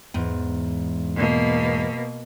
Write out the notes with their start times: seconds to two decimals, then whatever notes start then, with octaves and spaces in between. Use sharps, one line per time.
0.14 E2 G#2
1.16 B2 A#3